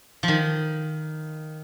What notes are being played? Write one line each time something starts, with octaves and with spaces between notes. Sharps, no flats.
F3
D#3